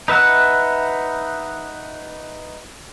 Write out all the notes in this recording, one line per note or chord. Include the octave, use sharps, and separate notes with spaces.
D#4 B4 E5 F#5